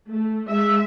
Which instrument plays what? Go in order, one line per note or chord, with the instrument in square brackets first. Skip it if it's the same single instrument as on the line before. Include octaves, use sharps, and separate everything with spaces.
[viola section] A3
G#3 E5